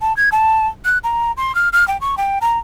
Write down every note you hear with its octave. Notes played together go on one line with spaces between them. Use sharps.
A5
G#6
A5
F#6
A#5
C6
F6
F6
G5
C#6
G5
A#5